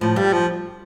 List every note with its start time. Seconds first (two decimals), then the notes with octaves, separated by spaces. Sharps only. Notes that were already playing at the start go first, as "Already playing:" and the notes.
0.01 A2 F3
0.16 G2 G3
0.33 F3